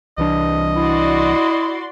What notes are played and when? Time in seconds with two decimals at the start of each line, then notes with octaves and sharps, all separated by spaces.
0.18 C2 E3 D4 D#5
0.76 E4 F#4 D5 C6